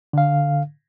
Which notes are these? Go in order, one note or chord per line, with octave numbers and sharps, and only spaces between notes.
D3 F5